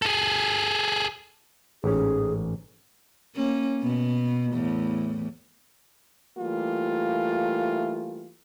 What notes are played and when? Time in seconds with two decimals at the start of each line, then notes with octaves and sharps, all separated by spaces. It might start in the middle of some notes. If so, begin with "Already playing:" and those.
0.02 G#4 A4
1.84 A1 G#2 C#4 G#4
3.35 A#3 C#4
3.80 B2 B3
4.53 E2 A2
6.38 E3 G3 A3 A#3 F4